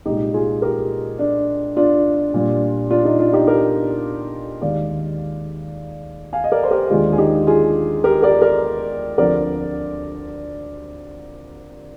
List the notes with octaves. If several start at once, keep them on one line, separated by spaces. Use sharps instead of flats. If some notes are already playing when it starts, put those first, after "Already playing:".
C2 A#2 G#3 D#4 G4
F4 G#4
G4 A#4
D4
D4 F4
A#2 G3 D4
D4 F4
D#4
D4 F4
D#4 G4
G4 A#4
D#2 D#3 G#3 D5 F5
F5 G#5
D#5
A#4 D5
C5
G4 A#4
D#2 D3 G#3 D4 F4 G#4
G#4
D#4 G4
F4 G#4
G4 A#4
A#4 D5
A#4 D5
D2 D3 F3 C4 A#4 D5